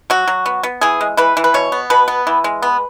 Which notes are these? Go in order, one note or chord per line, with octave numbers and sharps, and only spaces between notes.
F#3 F#4
F#3
B3
B3
E3 G#4
G#3
E3 B4
E3
B4
B2 C#5
B3
B2 B4
B3
E3
G#3
B3